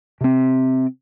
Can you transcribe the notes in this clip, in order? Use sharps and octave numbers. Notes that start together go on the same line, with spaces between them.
C3 C4